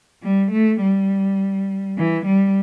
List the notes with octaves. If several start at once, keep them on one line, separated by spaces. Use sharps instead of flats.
G3
A3
G3
E3
G3